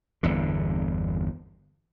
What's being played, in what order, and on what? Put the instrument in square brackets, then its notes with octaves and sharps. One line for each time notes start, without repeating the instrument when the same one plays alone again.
[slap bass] G1 E2 D3